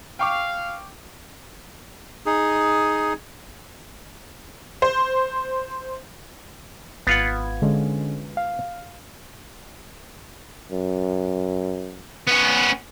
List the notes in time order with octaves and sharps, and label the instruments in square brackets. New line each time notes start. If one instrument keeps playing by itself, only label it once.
[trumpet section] F5 [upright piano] G5 C#6 D6
[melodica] D#4 G#4
[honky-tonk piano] C5
[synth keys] G#1 G#6 [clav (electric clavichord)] B3 F4 F#5
[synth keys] D3 G#3 C#4
F5
[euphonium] F#2
[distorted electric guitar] B3 C#4